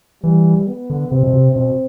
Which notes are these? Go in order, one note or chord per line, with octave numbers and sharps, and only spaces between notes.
E3 G3
B3
D3
C3 C4
B2
C3
B2 C4